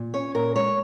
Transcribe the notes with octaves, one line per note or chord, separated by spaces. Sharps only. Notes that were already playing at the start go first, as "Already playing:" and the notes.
Already playing: A#2
C#4 C#5
A#2 A#4
G#3 C#5